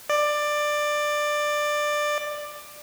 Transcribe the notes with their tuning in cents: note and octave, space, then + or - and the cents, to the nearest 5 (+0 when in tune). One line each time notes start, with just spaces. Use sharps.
D5 +15